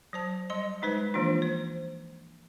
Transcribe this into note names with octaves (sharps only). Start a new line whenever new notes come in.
F#3 C5 A5
G3 D#5 C6
G#3 D#4 B4 C5
E3 F3 A#3 D4 F4
C5